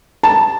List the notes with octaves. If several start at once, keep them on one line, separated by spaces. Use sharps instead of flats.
A5